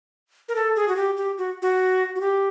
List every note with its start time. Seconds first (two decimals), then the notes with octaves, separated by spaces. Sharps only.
0.48 A#4
0.55 A4
0.76 G#4
0.88 F#4
0.96 G4
1.17 G4
1.38 F#4
1.62 F#4
2.15 F#4
2.21 G4